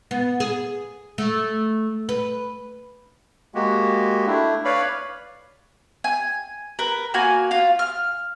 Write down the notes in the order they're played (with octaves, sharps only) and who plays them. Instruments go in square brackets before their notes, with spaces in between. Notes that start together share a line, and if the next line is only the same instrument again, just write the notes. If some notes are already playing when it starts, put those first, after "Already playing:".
[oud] B3
G#4
A3
B4
[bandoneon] G#3 A#3 F#4 G4
A3 D4 E4
B4 C#5 D5 F5 B5
[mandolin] G#5
A#4 B4
A#3 F#4 G#5
F4 F5
F6